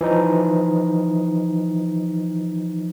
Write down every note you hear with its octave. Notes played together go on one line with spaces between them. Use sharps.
E3 F3 D#4